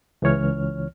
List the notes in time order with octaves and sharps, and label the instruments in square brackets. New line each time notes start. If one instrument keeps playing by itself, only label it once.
[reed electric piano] C#2 E3 C#5 F6